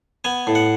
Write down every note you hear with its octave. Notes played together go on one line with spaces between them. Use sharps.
B3 G#5
A2
F#5